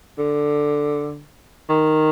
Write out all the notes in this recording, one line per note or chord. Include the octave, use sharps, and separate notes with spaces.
D3
D#3